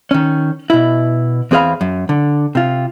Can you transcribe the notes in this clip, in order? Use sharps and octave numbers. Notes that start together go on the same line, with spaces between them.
D#3 C#4
B2 E4
E2 C4 G#4 B4 F5 B5
F#2
D3
C3 F4